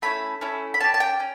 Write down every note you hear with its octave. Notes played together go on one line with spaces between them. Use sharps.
A3 C#4 E4 B5
A3 C#4 E4
B5
C#4 G4 A5
A5
G5
C#4